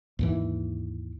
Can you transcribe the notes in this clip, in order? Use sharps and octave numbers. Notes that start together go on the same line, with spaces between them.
D#2 G#2 E3